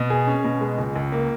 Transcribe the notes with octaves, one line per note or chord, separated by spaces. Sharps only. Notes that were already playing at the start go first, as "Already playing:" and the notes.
Already playing: B2
G#4
C#4
B2
G#3
C#2
C#2
A#3